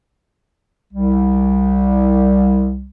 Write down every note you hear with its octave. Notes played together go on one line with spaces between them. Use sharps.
C2 G3